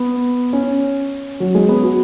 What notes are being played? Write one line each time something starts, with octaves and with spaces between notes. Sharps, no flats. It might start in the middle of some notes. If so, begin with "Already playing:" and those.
Already playing: B3
C#4
F#3
G#3
B3
F#4